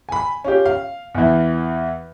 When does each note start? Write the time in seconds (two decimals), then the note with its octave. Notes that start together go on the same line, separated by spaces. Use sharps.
0.09 G#5 B5
0.44 C#4 F4 G4
0.66 F5
1.15 E2 E3